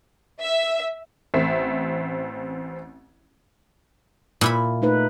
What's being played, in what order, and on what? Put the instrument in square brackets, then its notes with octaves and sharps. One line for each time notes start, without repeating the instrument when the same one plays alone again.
[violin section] E5
[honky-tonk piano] A1 C4 E5
[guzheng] A#2 E4 B5
[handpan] A3 D#4 B4